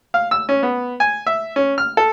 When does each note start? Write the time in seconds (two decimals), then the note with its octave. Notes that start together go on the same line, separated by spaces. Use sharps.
0.14 F5
0.31 E6
0.49 C#4
0.63 B3
1.00 G#5
1.27 E5
1.56 C#4
1.78 F6
1.97 A4